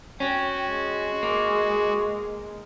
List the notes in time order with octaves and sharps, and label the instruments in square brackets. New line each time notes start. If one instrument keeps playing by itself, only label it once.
[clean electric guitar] C#4 [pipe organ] F#4 [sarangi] G5
[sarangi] G#3
[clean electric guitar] A#3